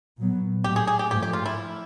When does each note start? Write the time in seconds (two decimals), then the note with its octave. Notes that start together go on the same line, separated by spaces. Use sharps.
0.18 A#2 F#3 B3
0.64 A2 F#3 A3 G4
0.76 G#4
0.87 G#4
0.99 G4
1.10 G#2 F3 A3 G4
1.22 G4
1.33 F4
1.46 E4